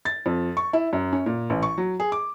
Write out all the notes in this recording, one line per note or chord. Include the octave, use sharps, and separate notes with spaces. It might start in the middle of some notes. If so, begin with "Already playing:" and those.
A6
F2
C#6
E4
F#2
C#4
A#2
A1
C#6
F#3
G#4
D6